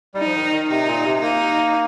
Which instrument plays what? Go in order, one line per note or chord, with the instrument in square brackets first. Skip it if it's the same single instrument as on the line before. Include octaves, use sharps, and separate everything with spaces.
[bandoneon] G3 [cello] D#4
[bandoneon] F3
D#3
D#3
[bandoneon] C3 [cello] D#4
[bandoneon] A#2
C3
[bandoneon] A#3 [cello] D#4